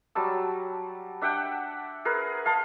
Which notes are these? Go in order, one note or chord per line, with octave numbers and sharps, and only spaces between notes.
F#3 G3 A5 E6
D4 E5 F#5 G5
G#4 A#4 B4
F5 A5 C6